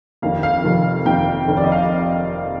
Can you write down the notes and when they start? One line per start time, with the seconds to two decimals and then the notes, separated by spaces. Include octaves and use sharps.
0.22 F1 F2 C3 D#3 F5
0.43 F5
0.64 F1 F2 C3 D#3
1.05 F1 F2 C3 D#3 G5
1.47 F1 F2 C3 D#3
1.57 D5
1.64 D#5
1.72 F5